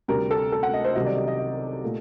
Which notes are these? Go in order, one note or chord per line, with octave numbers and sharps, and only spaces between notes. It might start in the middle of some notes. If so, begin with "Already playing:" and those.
D2 C3 G3 A#4
A4
A4
F#5
D#5
C5
C2 C3 D#3 F#3 D#5
D5
D#5
D#5
D#5
A#2 A3